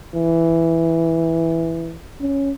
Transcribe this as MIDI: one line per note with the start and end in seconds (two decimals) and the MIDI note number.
0.16 1.98 52
2.21 2.52 61